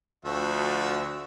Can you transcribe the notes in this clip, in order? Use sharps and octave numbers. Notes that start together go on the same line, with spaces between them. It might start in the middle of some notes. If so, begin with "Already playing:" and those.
D2 F3 F#4 E5